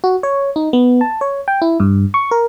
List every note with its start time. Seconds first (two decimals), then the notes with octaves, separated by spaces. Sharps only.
0.04 F#4
0.23 C#5
0.56 D#4
0.73 B3
1.01 A5
1.21 C#5
1.48 G5
1.62 E4
1.80 G2
2.14 C#6
2.31 A#4